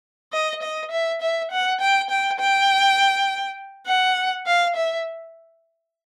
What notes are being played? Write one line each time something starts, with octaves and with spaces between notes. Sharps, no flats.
D#5
D#5
E5
E5
F#5
G5
G5
G5
F#5
F5
E5